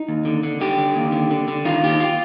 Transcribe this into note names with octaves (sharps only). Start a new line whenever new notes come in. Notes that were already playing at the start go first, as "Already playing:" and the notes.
Already playing: D#4
D#2
D3
D3
D3 G4
D3
D#2
D3
D3
D3
D#3 F4
D#2 G4
F4